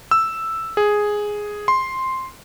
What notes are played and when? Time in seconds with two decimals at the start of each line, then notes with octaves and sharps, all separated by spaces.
0.11 E6
0.77 G#4
1.68 C6